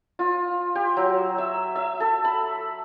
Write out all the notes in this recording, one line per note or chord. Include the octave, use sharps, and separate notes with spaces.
F4
G4
F#3
E5
E5
A4
B5